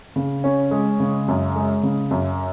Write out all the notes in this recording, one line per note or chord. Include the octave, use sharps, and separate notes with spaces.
C#3
C#4
G#3
C#3
F#2
G#3
C#3
F#2